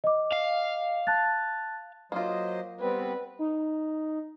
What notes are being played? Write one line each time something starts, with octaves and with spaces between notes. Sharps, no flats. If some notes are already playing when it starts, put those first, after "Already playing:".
D#5 D6
F5
A5 F#6 A6
F#3 A#3 F4 C5 D#5
G3 B3 C4 B4
D#4